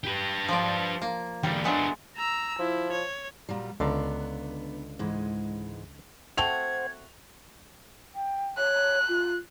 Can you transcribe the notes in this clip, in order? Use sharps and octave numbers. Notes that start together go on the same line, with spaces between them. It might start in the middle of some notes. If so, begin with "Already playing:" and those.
G4 B4
F3 F4 D5
A#3
E2 D3 G3
F#3 G#3 A3 B3 D4
A#5 E6
F3 E4
C#5
A#2 F#3 G3
C#2 D3 B3 D4 A#5
G#2 E3 G#3
A3 C4 F#4 C5 F#5 G#6 F7
G5
C#5 F#6
F4